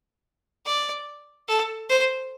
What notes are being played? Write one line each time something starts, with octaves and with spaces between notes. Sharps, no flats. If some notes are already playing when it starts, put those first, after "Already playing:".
D5
A4
C5